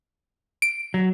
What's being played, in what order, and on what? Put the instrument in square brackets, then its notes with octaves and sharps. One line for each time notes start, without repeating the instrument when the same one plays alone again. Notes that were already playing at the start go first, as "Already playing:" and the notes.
[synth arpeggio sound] D7
[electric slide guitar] F#3